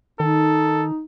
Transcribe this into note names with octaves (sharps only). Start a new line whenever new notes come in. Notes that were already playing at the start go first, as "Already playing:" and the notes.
D#3 D#4 A4